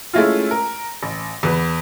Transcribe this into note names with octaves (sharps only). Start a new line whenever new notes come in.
G#3 A3 C#4 E4 F4
A#4
A1
E2 B4